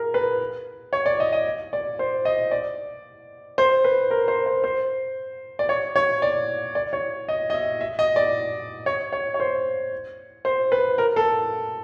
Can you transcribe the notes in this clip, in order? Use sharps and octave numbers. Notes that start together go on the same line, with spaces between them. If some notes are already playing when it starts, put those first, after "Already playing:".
Already playing: G#4 A#4
B4
C#5
D5
D#5
D#5
D5
C5
D#5
D5
C5
B4
A#4
C5
C5
C5
D5
C#5
C#5
D5
D5
C#5
D#5
D#5
E5
E5
D#5
D5
C#5
C#5
C#5
C5
C5
B4
A#4
A4